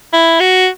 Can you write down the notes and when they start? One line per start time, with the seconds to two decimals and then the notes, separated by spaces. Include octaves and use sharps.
0.13 E4
0.40 F#4